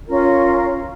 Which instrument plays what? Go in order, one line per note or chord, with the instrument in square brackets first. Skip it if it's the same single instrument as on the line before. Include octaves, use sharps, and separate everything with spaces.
[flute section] C#4 F4 A#4